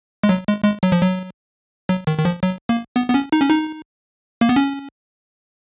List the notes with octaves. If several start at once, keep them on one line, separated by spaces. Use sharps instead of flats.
G#3
F#3
G#3
G#3
F#3
F3
F#3
F#3
D#3
D#3
F3
F#3
A#3
B3
B3
C#4
D#4
C#4
D#4
A#3
B3
C#4